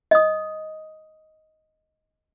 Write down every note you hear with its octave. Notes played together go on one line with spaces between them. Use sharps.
D#5 D#6